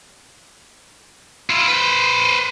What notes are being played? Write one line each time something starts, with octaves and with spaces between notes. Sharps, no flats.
E4 F4
B4 C5